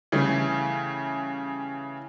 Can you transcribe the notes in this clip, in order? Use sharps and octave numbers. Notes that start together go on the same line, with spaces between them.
C#3 E3 G3 A3